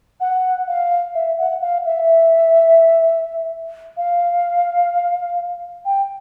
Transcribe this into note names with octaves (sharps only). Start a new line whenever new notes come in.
F#5
F5
E5
F#5
F5
E5
F5
G5